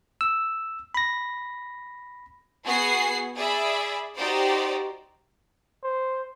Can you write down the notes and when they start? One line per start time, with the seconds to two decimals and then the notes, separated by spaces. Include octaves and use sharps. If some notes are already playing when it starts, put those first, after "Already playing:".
0.21 E6
0.95 B5 A#6
2.66 B3 F#4 G#4 F#5 G#5 C7
3.37 G#4 D5 E5 B5
4.16 D#4 F#4 G4 C5 D5
5.84 C5